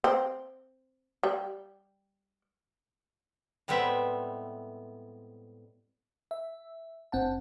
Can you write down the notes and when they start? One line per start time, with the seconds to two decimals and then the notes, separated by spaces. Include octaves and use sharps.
0.04 C4
1.23 G3
3.68 A2 G3 G#3 B3 C4 E5
6.31 E5
7.12 G1 C4 F#5 A5